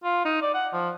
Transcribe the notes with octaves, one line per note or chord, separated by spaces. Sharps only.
F4
D#4
D5
F#5
F3